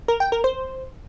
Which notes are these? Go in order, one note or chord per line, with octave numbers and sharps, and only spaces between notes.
A#4
G5
A#4
C5